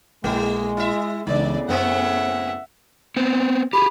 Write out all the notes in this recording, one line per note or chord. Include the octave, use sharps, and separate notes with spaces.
A#1 G#3 A3 E4
E4 E5
C#2 A2 C#3 E3 B3 D4 D#4 D5
F#2 A3 A#3 C4 E5 F#5
B3 C4
G4 G#4 B5